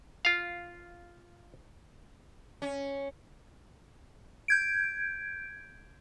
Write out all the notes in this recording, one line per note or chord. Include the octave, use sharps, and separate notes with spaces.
F4 F5
C#4
G6 G#6 D7